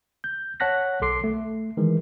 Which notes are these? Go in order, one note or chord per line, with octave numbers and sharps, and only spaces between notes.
G6
C#5 F#5 A5 F#6 A#6 B6
B1 A4 C6 D6 C7
A3
D#3 E3 G#3